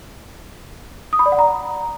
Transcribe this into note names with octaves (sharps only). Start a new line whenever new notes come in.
D#6
B5
D5
F#5
A#5